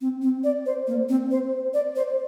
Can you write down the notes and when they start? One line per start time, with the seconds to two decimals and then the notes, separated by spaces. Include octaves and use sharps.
0.01 C4
0.22 C4
0.44 D5
0.66 C5
0.87 A#3
1.09 C4
1.31 C5
1.74 D5
1.96 C5